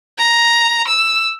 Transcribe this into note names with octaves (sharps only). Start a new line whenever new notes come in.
A#5
E6